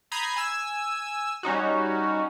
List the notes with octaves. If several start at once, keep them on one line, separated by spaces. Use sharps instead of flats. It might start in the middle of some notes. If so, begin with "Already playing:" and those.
A#5 B5 D#6 G6 G#6 C7
G#5 E6
G3 C#4 D#4 F#4